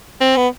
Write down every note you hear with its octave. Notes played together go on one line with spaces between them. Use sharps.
C4
B3